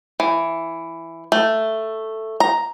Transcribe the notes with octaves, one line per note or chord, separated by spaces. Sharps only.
E3
A3
A#5